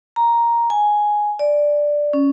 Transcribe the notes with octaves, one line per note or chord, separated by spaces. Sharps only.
A#5
G#5
D5
C#4